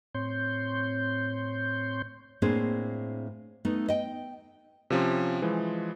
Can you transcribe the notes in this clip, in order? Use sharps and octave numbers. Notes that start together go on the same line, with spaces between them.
A2 C4 C#5 C6 G6
A2 A#3 C4 D4 G#4 C5
A3 B3 D#4
D#5 G5
C3 F3 C#4
E3 F3 G#3